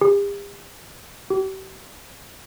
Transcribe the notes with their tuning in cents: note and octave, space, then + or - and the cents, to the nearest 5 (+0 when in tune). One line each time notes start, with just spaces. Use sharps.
G4 +45
G4 -40